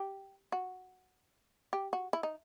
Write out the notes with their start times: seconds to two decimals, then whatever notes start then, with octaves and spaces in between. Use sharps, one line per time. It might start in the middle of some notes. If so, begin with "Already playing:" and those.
Already playing: G4
0.52 F#4
1.73 G4
1.93 F#4
2.13 E4
2.23 D#4